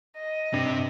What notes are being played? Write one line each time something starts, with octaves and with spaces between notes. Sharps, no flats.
D#5
G2 C3